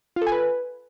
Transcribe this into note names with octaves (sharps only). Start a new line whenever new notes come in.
F4
A4
G#5
B4